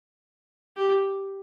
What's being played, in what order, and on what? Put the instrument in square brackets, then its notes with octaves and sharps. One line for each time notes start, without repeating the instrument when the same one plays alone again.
[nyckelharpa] G4